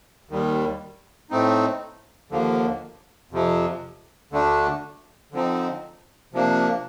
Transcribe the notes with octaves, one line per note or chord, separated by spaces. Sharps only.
D#2 D#3 G3
A2 A3 C4 D#4
D#2 D3 F3 A#3
F2 C3 F3
D2 D3 A3 D4
D3 F3 C4 D#4
C3 F3 A#3 D4